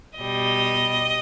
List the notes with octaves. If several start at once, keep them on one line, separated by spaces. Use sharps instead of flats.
B2 G3 D#5